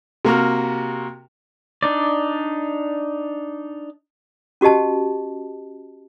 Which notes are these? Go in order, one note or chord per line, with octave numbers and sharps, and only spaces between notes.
C3 A#3 F#4 F6
D4 D#4 D5
C#4 F#4 G4 D#5 A5